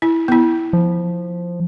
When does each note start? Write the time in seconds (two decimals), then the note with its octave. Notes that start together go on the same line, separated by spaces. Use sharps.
0.02 E4
0.28 B3 E4
0.73 F3